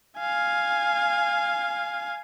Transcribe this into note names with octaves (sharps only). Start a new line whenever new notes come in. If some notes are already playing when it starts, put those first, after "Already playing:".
F5 G#5